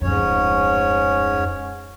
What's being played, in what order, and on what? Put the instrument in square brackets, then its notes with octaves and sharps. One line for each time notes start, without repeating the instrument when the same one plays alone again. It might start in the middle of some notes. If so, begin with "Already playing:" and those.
[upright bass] D1 F2 [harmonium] G#2 C#4 C#5